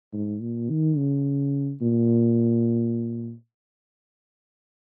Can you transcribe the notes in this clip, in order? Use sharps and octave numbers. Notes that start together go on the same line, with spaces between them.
G#2
A#2
D#3
C#3
A#2